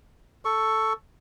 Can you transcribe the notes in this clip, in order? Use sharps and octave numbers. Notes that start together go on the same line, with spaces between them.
A4 C#6